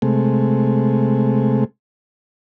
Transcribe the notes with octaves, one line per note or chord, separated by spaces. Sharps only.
C3 G#3 A3